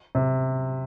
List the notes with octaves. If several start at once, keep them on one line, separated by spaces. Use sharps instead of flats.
C3